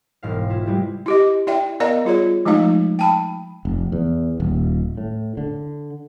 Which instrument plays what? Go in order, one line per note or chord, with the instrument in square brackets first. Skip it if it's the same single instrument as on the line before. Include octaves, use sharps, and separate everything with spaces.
[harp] E1 G#2 F5
E4 F4
C3 G3 G#3
[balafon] E4 G4 D#5
E4 D5 E5 G5
B3 A#4 D5 D#5 F5 A#5
G3 F4 G#4 C#5
F3 G#3 A3 D#4 F5
G5 A5 B5
[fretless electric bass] F1
E2
D#1
A2
D3